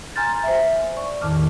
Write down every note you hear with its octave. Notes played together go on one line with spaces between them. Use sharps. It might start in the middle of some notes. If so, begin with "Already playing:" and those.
G#5 A#5 C6 F6 G6 A6
C5 E5
D5 C#6
E2 A2 D#3 A5 D6 F6